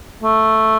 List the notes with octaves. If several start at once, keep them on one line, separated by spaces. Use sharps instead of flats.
A3